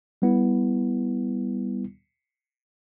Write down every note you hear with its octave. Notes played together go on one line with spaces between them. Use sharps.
G3 B3 E4